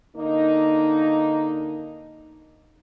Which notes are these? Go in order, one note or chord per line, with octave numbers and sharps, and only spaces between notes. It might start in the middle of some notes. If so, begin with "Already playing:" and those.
D3 A#3 D#4